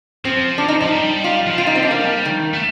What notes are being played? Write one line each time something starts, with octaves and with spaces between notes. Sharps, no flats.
F3 C4
D4
D#4
F3 D#4
G3
F4
F3
G3 F4
D#4
C4
D4
A#3
D#3
A3